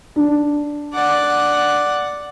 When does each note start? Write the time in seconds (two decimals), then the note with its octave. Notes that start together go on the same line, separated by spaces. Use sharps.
0.16 D4
0.94 D5 F#5